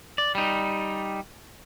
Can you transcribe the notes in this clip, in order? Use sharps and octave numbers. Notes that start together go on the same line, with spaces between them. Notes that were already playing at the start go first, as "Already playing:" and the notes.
D5
G3 D#4